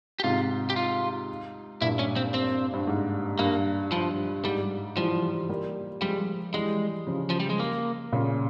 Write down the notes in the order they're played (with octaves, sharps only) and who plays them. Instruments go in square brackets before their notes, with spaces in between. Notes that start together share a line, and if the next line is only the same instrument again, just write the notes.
[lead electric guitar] G4
[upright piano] G#2 C3 [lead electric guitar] F4
[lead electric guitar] G4
F4
[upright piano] G2 A#2 [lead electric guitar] E4
[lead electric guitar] C#4
C4
C4
[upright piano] G2
G#2
[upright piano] G2 [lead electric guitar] A#3
[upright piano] G2 [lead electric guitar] F3
[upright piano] G#2 [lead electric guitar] G3
[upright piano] E3 G3 [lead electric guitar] F3
[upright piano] G3 A#3
[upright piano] F3 G#3 [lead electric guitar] G3
[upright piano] E3 G3 [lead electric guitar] G#3
[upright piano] C#3 F3
[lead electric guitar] F3
G3
G#3
A#3
[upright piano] A#2 C#3